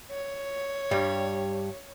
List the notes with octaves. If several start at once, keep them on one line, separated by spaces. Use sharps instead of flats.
C#5
G2 G3